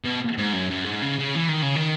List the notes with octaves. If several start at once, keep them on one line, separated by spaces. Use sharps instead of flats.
B2
G#2
F#2
F#2
G#2
C#3
C#3
E3
D#3
C#3
D#3